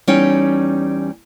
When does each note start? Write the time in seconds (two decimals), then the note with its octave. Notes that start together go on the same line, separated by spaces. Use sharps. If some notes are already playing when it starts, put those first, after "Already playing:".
0.07 E2 G3 C#4 D#4 C#5 G5